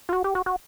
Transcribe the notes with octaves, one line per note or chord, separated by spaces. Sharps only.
F4
F#4
G4
F#4
F#4